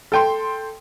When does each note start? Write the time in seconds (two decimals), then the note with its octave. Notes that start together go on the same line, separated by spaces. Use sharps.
0.12 A4 G5 C6